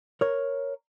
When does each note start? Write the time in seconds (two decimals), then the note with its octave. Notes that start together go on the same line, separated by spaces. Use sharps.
0.21 A#4 C#5